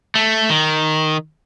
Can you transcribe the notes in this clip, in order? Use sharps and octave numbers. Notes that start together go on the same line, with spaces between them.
A3
D#3